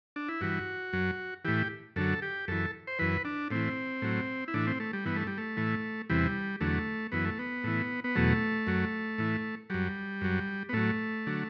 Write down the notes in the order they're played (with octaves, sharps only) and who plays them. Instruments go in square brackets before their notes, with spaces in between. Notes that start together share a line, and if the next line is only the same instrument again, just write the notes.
[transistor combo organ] D4
E4
G2 E3 F#4
F#2 F#3
A2 E3 G4
F#2 D3 F#3 A4
G4
F#2 E3 A4
C5
F#2 E3 B4
D4
A2 E3 C4
A2 F#3
E4
A2 E3 D4
C4
A3
G3
G2 E3 B3
A3
G3
A3
A2 E3
E2 C3 E3 G3
E2 D3 F#3 A3
F#2 E3 B3
A3
B3
A2 E3
B3
E2 B2 F#3 A3
F#2 F#3
A2 E3
F#2 F#3 G3
F#2 F#3
B3
A2 F#3 A3
D3 F#3